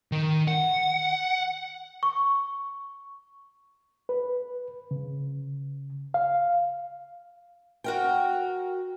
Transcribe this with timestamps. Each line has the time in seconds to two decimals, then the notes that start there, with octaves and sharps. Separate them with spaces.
0.12 D#3
0.48 F#5
2.03 C#6
4.09 B4
4.91 C#3
6.14 F5
7.84 F#4 A#4 G5